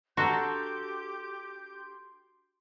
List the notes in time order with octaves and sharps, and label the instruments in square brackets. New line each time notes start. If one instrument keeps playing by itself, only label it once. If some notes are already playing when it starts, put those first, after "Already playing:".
[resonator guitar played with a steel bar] D4 A4 A#5 [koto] F#4 [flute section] G4 G6 [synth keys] C6